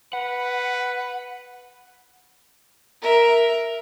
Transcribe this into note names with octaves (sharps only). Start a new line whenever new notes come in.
B4 F#5
A#4 E5